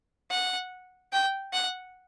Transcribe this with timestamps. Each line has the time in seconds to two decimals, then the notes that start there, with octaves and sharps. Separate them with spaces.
0.31 F#5
1.13 G5
1.53 F#5